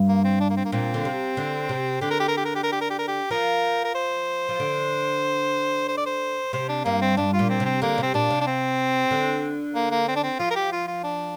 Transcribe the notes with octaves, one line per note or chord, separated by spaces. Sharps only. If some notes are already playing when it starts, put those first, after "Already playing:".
Already playing: G2
A#3
C4
D4
A#3
C4
A#3
A#2 C4
D3
C3
D3
C3
D3 G4
A#4
G4
A#4
G4
A#4
G4
A#4
G4
A#4
G4
A#4
G4
F3 A#4
A#4
C5
F3
D3
C5
D5
C5
C3 C5
D4
G2 A#3
C4
G2 D4
F4
A#2
C4
C3
C4
D3 A#3
C3 C4
A#2 D4
C3
D4
C4
D3
A#3
A#3
C4
D4
C4
F3 F4
A#4
G4
F4
F4
D4